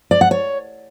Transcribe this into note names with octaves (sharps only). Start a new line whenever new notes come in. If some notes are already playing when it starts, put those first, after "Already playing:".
D5
F#5
C#5